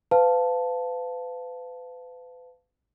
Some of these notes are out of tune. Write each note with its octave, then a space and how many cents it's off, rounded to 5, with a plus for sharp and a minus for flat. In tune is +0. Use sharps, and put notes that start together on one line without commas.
B4 +35 F5 +0 A5 +0